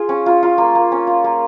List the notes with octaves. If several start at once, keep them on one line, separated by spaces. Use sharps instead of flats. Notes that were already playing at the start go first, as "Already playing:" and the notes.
Already playing: F4 G#4
C#4
F4
F4
A#3
A#3
C#4
F4
A#3